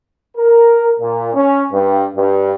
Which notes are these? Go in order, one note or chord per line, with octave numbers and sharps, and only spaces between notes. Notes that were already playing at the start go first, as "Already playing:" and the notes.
A#4
A#2
C#4
G2
G2